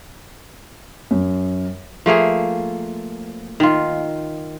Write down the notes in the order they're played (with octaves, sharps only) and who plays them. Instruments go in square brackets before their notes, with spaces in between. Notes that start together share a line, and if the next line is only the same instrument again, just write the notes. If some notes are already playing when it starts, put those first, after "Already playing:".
[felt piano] F#2
[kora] F3 A3 A#3 G#4
D#3 F4